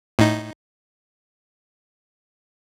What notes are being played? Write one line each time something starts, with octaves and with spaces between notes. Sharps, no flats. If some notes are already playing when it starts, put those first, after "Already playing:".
A2 D#4